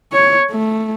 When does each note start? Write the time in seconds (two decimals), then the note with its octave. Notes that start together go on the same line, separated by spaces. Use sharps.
0.12 C#5
0.51 A3